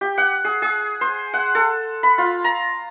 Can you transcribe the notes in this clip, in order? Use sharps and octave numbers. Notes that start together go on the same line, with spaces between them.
G4
F#5
G#4
G#4
C5
F#5
A4
B5
F4
A#5